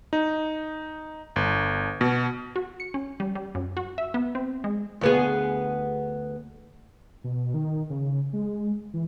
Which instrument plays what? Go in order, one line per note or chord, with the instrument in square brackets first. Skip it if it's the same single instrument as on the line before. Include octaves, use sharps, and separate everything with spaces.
[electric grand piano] D#4
G1
B2
[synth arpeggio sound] F#4
C#7
C#4
G3
G3
F#2
F#4
E5
B3
C4
G#3
[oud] D2 B3 G#4
[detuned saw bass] B2
D#3
C#3
G#3
E3